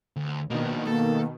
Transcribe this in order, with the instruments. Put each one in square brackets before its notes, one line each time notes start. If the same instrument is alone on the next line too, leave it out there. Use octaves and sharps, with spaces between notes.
[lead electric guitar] D2
[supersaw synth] B2 D#3 [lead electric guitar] A#3 D4
[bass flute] A#3 [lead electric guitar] A4